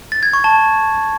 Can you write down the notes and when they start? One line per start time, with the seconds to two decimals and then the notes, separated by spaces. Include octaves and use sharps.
0.12 A6
0.23 G#6
0.33 C#6
0.44 A5